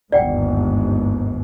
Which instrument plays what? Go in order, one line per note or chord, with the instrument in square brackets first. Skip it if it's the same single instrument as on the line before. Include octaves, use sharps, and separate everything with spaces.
[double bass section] G1 D#2 G#2 [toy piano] D5 F#5 G5